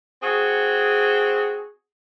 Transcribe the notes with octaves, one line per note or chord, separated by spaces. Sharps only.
C4 F#4 G#4